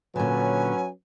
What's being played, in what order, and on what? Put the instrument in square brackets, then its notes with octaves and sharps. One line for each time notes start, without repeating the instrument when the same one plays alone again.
[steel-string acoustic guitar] A#2 D3 [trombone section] F#3 C#4 B4 [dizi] G#5